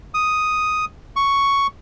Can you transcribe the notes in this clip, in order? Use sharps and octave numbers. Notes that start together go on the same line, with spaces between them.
D#6
C#6